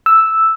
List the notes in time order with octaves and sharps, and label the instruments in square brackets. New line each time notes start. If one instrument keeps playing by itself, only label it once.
[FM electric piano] E6